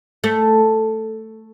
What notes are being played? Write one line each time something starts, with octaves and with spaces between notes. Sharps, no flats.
A3